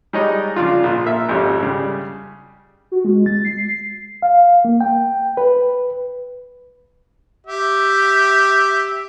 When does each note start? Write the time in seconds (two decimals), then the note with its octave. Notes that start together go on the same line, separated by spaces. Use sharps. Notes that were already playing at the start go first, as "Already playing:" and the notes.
0.13 G3 G#3 D#4 C#5 D#5
0.56 C#3 F3 D4 F4
0.83 A#1 F4
1.06 A#3 E5
1.29 G#1 F2 C#4 G4
1.62 C#3 G3
2.92 F#4
3.05 G#3
3.26 A6
3.45 C7
3.67 C7
4.22 F5
4.65 A#3
4.81 G5
5.37 B4
7.47 G4 E5